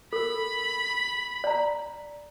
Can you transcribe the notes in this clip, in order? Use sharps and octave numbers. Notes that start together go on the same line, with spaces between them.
A4 A#4 B5
D5 A#5